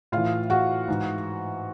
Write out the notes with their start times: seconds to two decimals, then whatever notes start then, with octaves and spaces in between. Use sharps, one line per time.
0.12 A2 E3 F4 F5
0.50 F#4 F#5
0.88 G#2 E3